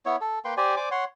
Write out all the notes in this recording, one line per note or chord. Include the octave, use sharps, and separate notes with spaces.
B3 E4 C#5
A4
A#3 B4 G5 C6
G4 C5 D5 G#5
C5 D5 G#5 D6
C#5 F#5 C6